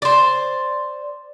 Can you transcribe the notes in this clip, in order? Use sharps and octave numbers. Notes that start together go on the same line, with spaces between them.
C5 D5